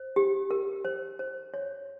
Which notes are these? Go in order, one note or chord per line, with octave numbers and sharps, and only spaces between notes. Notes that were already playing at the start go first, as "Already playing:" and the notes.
Already playing: C5
G4
A#4
C5
C5
C#5